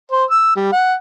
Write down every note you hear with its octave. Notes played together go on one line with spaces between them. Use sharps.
C5
E6
G3
F#5